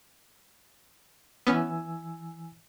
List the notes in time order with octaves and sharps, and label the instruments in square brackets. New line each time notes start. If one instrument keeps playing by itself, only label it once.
[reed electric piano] E3 G#5 E6 [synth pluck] B3 C#4